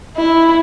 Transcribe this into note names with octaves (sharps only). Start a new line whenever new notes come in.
E4